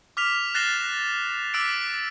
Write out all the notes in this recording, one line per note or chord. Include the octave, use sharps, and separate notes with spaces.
D6 F6 B6 F7
F#6 A6 A#6 C7 E7 G7
D6 E6 F#6 A6 B6 D7